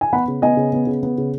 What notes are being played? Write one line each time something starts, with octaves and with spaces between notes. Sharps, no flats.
G#5
B3 F#5 B5
C#3
B3 D#5 G#5
C#3
B3
C#3
B3
C#3